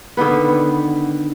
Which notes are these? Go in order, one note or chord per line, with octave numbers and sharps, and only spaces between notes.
D3 D#3 B3 B4